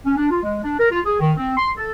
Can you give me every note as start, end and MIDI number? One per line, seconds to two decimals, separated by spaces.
0.05 0.15 61
0.17 0.28 62
0.30 0.42 65
0.43 0.63 56
0.63 0.79 62
0.79 0.89 70
0.91 1.00 65
1.06 1.17 68
1.20 1.32 51
1.37 1.53 60
1.57 1.71 84
1.77 1.92 69